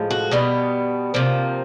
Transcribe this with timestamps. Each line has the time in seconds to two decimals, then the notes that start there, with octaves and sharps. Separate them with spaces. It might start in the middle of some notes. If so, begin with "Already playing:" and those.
Already playing: A2 F3 G#3
0.11 F#4
0.31 B2 G3 B3
1.14 C3 F3 A#3